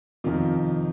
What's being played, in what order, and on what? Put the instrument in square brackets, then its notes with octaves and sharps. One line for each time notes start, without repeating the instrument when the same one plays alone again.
[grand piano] F2 C3 D#3 F4